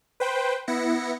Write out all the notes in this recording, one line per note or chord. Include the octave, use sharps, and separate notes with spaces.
B4 C5 G5
B3 E4 A#6 C#7